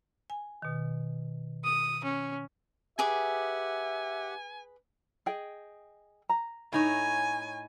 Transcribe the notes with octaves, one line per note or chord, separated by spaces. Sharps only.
G#5
B2 D#3
D#6
C#4
G4 G#4 B4 E5 F#5 G#5 D6
G#4 D#5 G5
A#5
A2 D#4 C#5 G#5